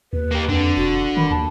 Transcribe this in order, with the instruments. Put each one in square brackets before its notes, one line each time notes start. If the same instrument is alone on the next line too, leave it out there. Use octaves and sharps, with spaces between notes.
[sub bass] D#2 [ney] B4
[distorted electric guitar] A#3 G4
[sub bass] F2 [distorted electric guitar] D3
[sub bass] E1 [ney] F#4
[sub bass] D#3 [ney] B5
[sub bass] D#2 [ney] A5